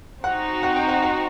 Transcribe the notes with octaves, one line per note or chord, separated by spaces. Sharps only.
C4 D#4 F#4 F#5
F#5
G5
F#5
F#5